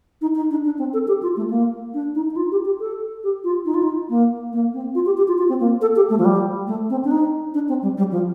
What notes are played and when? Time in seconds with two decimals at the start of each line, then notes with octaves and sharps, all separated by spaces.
0.21 D#4
0.35 D#4
0.51 D4
0.65 D4
0.78 C4
0.93 A4
1.08 G4
1.22 F4
1.37 A3
1.50 A#3
1.94 D4
2.15 D#4
2.30 D#4
2.36 F4
2.52 G4
2.65 G4
2.80 A4
3.24 G4
3.44 F4
3.65 D#4
3.74 F4
3.83 D#4
4.10 A#3
4.53 A#3
4.74 C4
4.95 F4
5.06 G4
5.17 G4
5.28 F4
5.38 F4
5.49 C4
5.60 A#3
5.81 A4
5.96 G4
6.10 A3
6.18 F3
6.25 G3
6.67 A3
6.90 C4
7.04 D4
7.11 D#4
7.54 D4
7.69 C4
7.82 G3
7.97 G3
8.12 F3